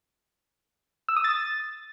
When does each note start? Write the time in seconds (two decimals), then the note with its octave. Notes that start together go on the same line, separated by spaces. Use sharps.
1.09 E6
1.16 D#6
1.24 A6